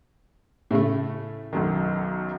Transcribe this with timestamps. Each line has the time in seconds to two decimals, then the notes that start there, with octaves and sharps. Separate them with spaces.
0.71 A2 C#3 A3
1.53 B1 F#2 D#3